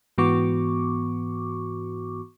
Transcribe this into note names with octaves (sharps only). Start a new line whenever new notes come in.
G#2 E3 B3 F#4 C#6 D6